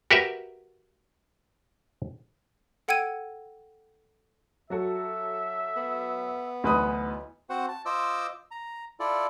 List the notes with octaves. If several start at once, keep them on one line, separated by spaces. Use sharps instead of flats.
F#4 G4 A#4 B4 E5
A4 F#5 G5 E6 G#6 D#7
F#3 F#4 A4 E5
B3
D2 E3 F#3 D#4 B4 D#6
C4 F#4 C5 F#5
A5
F4 C5 D#5 D6 E6
A#5
E4 F4 A4 D5